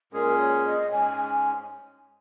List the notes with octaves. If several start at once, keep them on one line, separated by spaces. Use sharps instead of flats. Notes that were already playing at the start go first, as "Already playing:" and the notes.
A#2 G#3 C#4 G#4 A#4
C#5
D#5
G#2 G#3 C#4 G#5
G#5